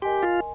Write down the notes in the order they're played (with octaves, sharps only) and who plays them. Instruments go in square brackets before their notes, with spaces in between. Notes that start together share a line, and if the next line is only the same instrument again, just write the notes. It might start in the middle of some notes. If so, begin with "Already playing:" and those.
[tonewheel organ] G4 [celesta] A#4 D#5 G#5 C6
[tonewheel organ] F4